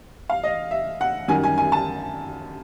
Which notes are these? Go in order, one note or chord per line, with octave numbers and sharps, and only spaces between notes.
F5
D#5
E5
F#5
F#2 D#3 G3 G#5
G#5
G#5
A5